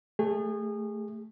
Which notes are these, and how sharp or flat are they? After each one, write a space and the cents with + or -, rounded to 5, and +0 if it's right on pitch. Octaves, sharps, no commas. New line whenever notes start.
A3 +0 G#4 -30